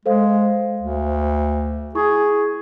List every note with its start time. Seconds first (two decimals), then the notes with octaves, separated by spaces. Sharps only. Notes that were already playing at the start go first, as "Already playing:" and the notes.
0.06 G#3 A4 C5 F5
0.82 D2
1.95 E4 G#4 C#6